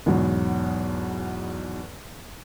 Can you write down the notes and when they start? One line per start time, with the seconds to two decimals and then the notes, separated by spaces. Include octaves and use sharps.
0.06 E2 G#2 B2 F#3